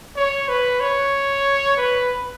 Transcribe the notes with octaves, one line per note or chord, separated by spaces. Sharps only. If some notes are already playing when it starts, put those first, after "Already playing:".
C#5
B4
C#5
B4